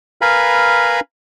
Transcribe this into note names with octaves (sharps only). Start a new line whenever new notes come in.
A#4 B4 F5 G#5 A#5 B5